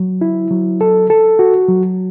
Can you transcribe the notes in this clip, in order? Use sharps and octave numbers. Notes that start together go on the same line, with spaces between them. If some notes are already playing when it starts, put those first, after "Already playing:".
Already playing: F#3
E4
F#3
A4
A4
F#4
F#3